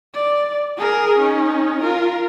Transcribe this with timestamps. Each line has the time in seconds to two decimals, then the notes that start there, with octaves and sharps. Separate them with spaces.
0.14 D5
0.77 G#4 A#4
1.19 C#4 D#4
1.82 F4 A#4